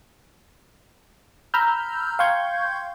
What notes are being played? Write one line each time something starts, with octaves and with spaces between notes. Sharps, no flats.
A#5 B5 E6 F6 G6
F5 G5 C6 C#6 G6 G#6